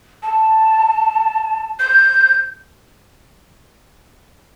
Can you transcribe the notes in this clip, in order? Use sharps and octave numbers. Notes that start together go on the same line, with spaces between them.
A5
G6